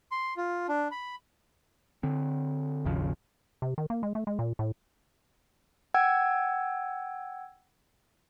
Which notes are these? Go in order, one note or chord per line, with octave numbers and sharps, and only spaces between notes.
C6
F4
D4
B5
D3 C4
G#1 D#2 C#3 F3
C3
D#3
A#3
G#3
A3
G#3
A#2
A2
F#5 G5 E6 G#6